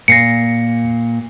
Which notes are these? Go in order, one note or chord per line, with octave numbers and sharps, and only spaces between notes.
A#2 A#6 C7 C#7